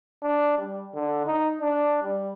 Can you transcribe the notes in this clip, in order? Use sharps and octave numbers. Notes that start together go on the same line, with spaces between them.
D4
G3
D3
D#4
D4
G3